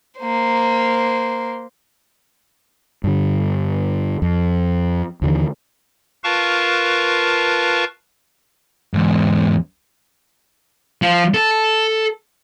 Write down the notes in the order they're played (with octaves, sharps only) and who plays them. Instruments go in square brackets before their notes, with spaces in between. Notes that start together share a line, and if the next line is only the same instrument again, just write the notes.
[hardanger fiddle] A#3 C5
[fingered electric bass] G2 D3
F2
D#2 D3 E3
[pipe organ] F4 A#4 B4 F5 A5 C#6
[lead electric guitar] E2 G#2
[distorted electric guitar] F3
A4